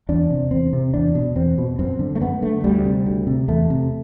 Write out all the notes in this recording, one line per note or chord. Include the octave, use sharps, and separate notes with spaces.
E2 D4
C3
E2 C4
C3
E2 D4
B2
E2 C4
B2
F#2 C4
D3
A3
F#2 B3
D3 A3
D2 G3
C3
D2
C3
E2 A3
C3